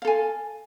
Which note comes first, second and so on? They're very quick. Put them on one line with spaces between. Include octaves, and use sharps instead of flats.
F5 A4 G#5